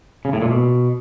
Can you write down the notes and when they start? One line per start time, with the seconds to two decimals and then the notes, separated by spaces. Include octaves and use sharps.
0.25 C#3
0.33 A2
0.42 A#2
0.50 B2